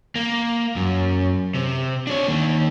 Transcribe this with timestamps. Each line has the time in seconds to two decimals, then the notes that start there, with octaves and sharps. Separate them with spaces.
0.15 A#3
0.76 F#2
1.55 C3
2.07 D4 C#5
2.28 D#3 A#3